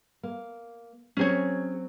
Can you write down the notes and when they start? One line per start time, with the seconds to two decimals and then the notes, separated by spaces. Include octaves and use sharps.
0.23 A#3
1.17 F#3 C4 C#4 G#4 C#5